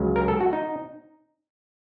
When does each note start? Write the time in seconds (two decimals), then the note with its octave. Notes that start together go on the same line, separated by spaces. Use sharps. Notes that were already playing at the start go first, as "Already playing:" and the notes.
Already playing: C#2 C#3 F#3
0.16 A#4
0.28 A4
0.41 F#4
0.53 D#4